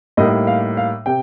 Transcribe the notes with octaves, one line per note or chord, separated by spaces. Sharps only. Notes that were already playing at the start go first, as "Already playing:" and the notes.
A2 G3 A#3 D#4 D#5
F5
F5
C3 G5